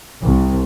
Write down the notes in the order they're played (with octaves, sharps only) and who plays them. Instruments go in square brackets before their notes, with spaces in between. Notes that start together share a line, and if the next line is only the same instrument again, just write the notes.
[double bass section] C2